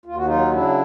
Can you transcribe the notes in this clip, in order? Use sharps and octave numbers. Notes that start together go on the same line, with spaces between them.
D#2 F4
F#4
F#3 D#4 F4
C#3 D4 E4